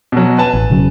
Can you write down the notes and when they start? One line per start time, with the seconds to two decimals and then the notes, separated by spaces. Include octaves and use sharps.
0.12 B2 F#3
0.38 B4 G#5 A5
0.53 A1
0.70 E1 C#3 F#3